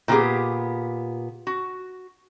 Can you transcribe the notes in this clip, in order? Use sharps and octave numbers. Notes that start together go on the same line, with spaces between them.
A#2 E3 B3 G4 G#4
F#4